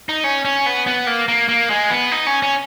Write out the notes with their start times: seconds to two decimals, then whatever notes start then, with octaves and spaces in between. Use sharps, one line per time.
0.09 D#4
0.24 C#4
0.45 C#4
0.66 B3
0.87 B3
1.07 A#3
1.28 A#3
1.49 A#3
1.70 G#3
1.90 B3
2.12 D#4
2.27 C#4
2.42 C#4